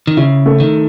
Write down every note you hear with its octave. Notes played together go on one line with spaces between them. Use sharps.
D#3
C#3 E4
A3
D#3